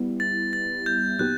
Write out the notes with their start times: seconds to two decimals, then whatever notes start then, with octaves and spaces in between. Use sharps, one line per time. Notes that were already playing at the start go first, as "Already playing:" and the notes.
Already playing: G3 B3 E4
0.20 A6
0.53 A6
0.86 G6
1.19 A#2 F#3 B3 D#4 G4 F#6